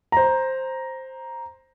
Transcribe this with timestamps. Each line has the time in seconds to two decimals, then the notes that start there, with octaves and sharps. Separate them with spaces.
0.12 C5 A#5